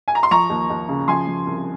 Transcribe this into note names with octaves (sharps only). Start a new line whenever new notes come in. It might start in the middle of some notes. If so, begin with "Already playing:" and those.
G#5
A#5
C6
F3 A#5 C#6
D#2
D#2
C#3
F3 G#5 C6
F3
C2